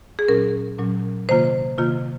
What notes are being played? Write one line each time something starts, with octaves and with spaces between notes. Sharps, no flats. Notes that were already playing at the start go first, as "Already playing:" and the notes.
G#4
A#2 F#3 C#4 A#4
A#2 F#3 C#4
C3 D#3 A#3 F4 C5
C3 D#3 A#3 F4